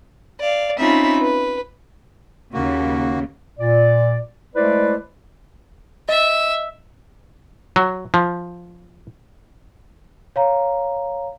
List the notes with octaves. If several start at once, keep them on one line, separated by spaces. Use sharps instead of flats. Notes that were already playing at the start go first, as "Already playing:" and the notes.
D5 F5
C4 C#4 D#4 F4 E5 B5
B4
D#2 C#3 A#3 F#4
A#2 D5
G#3 A3 E4 B4 C5 D5
D#5 E5
F#3
F3
C#5 F5 A#5